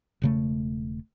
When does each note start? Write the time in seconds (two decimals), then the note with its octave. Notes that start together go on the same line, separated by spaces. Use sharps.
0.22 E1 C#3 A3